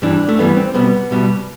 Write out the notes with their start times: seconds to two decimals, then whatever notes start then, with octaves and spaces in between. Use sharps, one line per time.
0.02 G2 E3 G3 D4
0.29 A3
0.38 G2 E3 G3 B3
0.57 C4
0.74 C2 B2 G3 B3
1.11 C2 B2 G3